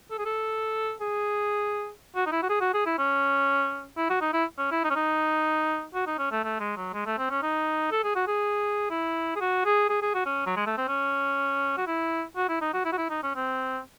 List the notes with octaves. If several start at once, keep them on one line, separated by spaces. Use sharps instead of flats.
A4
G#4
A4
G#4
F#4
D#4
E4
F#4
G#4
F#4
G#4
E4
C#4
E4
F#4
D#4
E4
C#4
E4
D#4
C#4
D#4
F#4
D#4
C#4
A3
A3
G#3
F#3
G#3
A3
C4
C#4
D#4
A4
G#4
F#4
G#4
E4
G#4
F#4
G#4
G#4
G#4
F#4
C#4
F#3
G#3
A3
C4
C#4
F#4
E4
F#4
E4
D#4
F#4
E4
F#4
E4
D#4
C#4
C4